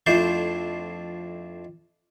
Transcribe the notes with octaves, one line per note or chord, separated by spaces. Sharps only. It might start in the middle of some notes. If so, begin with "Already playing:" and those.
F2 A3 D4 E4 F4 C5